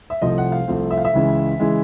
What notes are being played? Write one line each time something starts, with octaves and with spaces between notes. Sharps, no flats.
E5
C2 C3 F3 A3 C4 D#5
F#5
F5
C2 C3 F3 A3 C4
E5
F5
E5
C#2 C#3 E3 G#3
C#3 E3 G#3